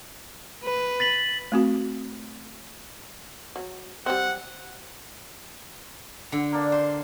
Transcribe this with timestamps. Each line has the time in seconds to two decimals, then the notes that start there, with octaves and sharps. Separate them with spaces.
0.63 B4
1.00 A6 B6 F#7
1.52 A3 C4 F#4
3.56 F#3
4.06 G3 C4 F#5
6.32 D3
6.52 A#3 D4
6.72 C5 C6